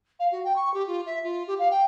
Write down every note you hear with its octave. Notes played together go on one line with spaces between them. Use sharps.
F5
F#4
G5
C#6
G4
F4
E5
F4
G4
F5
G5